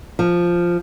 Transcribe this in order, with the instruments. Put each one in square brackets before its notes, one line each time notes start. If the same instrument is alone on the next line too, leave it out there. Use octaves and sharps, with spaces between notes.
[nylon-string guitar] F3